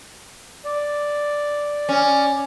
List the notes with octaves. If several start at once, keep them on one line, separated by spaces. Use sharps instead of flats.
D5
C#4